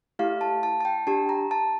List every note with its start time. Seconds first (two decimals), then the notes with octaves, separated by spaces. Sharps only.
0.19 A3 E4 G4 F5
0.41 A5
0.63 A5
0.80 A5
0.85 G5
1.07 D4 G4 A5
1.29 A#5
1.51 A5